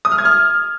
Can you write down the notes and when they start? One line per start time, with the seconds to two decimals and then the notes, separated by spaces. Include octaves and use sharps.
0.05 D#6
0.12 F6
0.18 G#6
0.25 F6